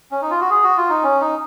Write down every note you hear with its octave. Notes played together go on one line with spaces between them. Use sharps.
C#4
D#4
F4
F#4
G#4
F#4
F4
D#4
C#4
D#4